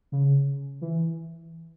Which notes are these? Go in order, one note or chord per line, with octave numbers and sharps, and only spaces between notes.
C#3
E3